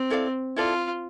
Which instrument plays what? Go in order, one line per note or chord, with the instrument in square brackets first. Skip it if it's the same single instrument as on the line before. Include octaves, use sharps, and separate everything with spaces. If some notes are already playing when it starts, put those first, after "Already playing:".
Already playing: [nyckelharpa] C4
[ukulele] E4 A4 D5 F5
[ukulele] E4 A4 D5 [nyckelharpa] F4